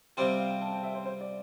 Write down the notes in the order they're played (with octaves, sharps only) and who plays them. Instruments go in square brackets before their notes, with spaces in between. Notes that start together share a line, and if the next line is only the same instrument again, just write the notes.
[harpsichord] C3 G3 C4 F4 [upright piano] G5
[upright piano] G5
F5
G5
A5
G5
E5
C5
C5
D5